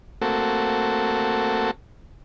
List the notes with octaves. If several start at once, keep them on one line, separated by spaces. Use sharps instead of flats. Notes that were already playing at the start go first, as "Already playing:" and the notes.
A3 A#3 C4 F#4 A4